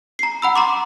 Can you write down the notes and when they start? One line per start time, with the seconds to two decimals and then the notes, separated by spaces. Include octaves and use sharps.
0.19 A#5 C7
0.42 F#5 B5 E6
0.56 A#5 C6 D6